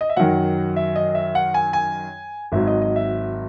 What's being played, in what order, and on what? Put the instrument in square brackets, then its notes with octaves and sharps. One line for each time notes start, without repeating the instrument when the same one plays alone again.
[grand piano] D#5
E5
F#2 D#3 F#3 F#5
E5
D#5
E5
F#5
G#5
G#5
G#1 G#2 F#3 E5
D#5
D#5
E5